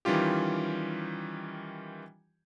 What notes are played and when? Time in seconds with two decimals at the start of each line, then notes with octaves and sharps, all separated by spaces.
0.05 D#3 E3 G3 C#4 F4 G4